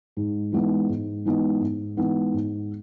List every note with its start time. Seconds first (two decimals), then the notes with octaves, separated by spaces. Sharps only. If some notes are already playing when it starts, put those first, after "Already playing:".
0.17 G#2
0.52 E3 G#3 B3 D#4
0.89 G#2
1.25 E3 G#3 B3 D#4
1.61 G#2
1.97 E3 G#3 B3 D#4
2.34 G#2